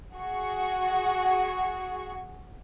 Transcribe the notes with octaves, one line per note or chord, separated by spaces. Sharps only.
F#4 G#4 C#6